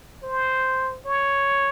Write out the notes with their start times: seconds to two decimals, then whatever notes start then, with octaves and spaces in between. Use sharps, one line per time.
0.23 C5
1.05 C#5